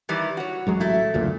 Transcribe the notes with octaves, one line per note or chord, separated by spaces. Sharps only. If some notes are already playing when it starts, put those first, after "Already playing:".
D#3 E3 G3
F#4 C#5
A1 F#3 G#3
A3 E4
F#1 D2 A#2